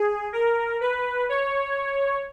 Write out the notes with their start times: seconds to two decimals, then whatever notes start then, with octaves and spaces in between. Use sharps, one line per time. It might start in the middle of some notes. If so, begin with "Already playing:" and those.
Already playing: G#4
0.33 A#4
0.81 B4
1.29 C#5